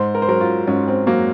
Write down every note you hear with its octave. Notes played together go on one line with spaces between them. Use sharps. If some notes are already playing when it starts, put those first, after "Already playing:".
Already playing: G#2 C5
A#4
C5
F#3 A#4
F4
G#2 C#4
C4
F#3 A#3